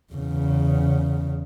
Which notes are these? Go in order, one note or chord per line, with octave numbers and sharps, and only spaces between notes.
E2 C#3